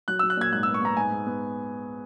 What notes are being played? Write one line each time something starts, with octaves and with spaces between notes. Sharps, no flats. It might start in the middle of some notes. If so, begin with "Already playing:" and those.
F#3 F#6
E6
F#3
F#6
A#2 G#6
G#2 F#6
E6
B3
C#6
B3 A#5
G#2 G#5
G#2
B3